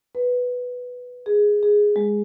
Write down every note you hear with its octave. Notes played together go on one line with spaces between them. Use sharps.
B4
G#4
G#4
G#3